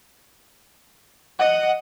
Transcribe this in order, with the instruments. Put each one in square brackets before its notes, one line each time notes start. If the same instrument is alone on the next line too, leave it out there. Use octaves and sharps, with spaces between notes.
[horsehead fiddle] D#5 [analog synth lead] F#5